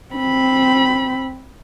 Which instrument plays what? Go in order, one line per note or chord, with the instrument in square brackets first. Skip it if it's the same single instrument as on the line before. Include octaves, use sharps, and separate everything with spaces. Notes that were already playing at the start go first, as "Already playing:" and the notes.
[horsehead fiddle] C4 B5